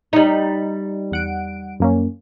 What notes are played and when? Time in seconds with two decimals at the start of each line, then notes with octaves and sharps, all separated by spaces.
0.13 G3 D#4
1.11 E2 F#5 D7
1.80 F#2 A#3 C#4